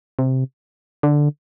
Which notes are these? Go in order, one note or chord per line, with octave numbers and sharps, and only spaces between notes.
C3
D3